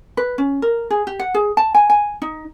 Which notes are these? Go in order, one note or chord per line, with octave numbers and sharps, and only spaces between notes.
B4
C#4
A#4
G#4
G4
F#5
G#4
A5
G#5
G#5
D#4